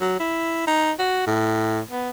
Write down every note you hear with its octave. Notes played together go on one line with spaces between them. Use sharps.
F#3
E4
D#4
F#4
A2
B3